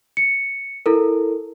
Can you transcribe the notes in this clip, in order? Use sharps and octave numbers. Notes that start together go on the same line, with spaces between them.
C#7
E4 A4 A#4